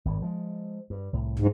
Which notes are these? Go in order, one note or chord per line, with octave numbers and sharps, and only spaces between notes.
G#1 G2
F3 G#3
G2
C2 A2
G#2